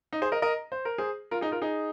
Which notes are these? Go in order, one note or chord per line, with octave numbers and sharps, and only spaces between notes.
D#4
G#4 C5
A#4 D#5
A#4 D#5
C5
A#4
G#4 C5
F4 A#4
D#4 G#4
F4 A#4
D#4 G#4